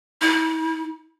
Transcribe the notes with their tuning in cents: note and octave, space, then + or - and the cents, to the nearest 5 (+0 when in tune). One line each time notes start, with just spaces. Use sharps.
E4 -40